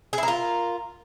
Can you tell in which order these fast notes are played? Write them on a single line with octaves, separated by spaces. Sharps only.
G#4 E4 A#4 F4